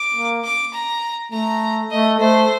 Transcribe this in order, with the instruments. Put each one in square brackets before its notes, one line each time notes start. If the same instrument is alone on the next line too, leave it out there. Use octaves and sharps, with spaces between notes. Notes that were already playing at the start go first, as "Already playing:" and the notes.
Already playing: [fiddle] D6
[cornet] A#3
[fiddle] D6
A#5
[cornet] A3 [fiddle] A#5
[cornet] A3 [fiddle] D#5
[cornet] A3 [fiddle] C5